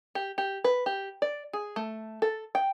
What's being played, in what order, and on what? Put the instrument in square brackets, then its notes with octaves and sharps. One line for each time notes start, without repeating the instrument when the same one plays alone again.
[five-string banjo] G4
G4
B4
G4
D5
G#4
A3
A4
G5